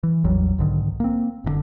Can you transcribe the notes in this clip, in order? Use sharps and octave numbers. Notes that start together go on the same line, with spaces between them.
E3
A1 E2 F#3 G3
B1 G#2 D3 D#3
A#3 C4
F#1 A2 D3